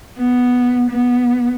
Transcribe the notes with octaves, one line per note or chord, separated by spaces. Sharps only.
B3
B3